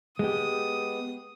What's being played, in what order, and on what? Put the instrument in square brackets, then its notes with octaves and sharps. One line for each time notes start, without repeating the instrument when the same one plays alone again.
[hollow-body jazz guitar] G#3 B3 G4 [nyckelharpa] D#6